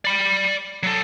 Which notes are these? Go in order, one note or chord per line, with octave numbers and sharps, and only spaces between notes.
D5 B5
F#3 A4